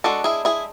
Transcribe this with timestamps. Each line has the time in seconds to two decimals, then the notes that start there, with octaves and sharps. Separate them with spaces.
0.04 G#3 D4 F#4 A4
0.24 E4 G#4
0.45 E4 G#4